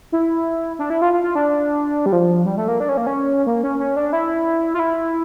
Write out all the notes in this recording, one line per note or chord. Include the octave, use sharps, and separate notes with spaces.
E4
D4
E4
F4
F4
F4
D4
G3
F3
G3
A3
A#3
D4
C#4
A#3
C#4
A#3
C#4
C#4
D4
E4
F4
E4